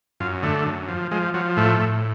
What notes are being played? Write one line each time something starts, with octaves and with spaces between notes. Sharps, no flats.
F#2 F4
D3 A3
F#2
F3
F3 G#3
F3 F#3
A2 A3
A2